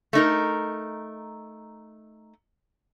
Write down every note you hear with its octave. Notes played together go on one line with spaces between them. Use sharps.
A3 D#4 A#4